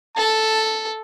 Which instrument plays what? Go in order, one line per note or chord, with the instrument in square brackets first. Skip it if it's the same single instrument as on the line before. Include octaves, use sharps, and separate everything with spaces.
[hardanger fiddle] A4 [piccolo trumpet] A5